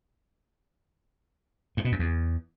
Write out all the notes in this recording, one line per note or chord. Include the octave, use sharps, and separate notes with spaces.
G2
B2
F#2
E2